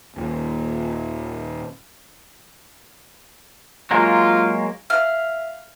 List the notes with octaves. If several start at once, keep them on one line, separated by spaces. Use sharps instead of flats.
D#1 A#2
F#3 G#3 A#3 F4
E5 F5 F6